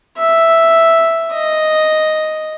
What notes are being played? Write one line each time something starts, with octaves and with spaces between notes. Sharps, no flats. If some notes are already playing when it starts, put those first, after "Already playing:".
E5
D#5